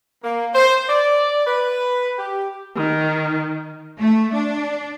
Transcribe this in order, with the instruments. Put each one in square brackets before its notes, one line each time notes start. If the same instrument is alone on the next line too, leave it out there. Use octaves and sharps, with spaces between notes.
[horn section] A#3
C5
D5
B4
G4
[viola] D#3
[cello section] A3
D4